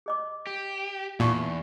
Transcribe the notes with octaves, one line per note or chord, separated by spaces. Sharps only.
G#4 D#5 D6
G4
E2 A#2 D#4 C#6